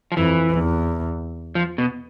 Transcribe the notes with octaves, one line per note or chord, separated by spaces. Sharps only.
F3
F2 E3
E2
F3
B2